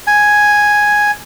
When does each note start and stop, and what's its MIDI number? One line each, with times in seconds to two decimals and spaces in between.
0.07 1.11 80